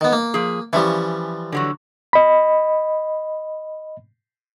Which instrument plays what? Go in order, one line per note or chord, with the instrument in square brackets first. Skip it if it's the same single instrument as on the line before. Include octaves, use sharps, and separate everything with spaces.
[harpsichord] D#3 B3
A#3
[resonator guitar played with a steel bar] F3 G#4
[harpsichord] E3 F3 G3 [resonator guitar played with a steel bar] C#4 E5
[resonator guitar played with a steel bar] D3 F#3 F#4
[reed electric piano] D#5 B5